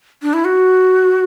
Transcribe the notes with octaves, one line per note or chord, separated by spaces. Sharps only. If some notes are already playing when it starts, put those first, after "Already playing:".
D4
E4
F#4